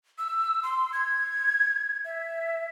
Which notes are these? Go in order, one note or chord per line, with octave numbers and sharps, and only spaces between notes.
E6
C6
G#6
E5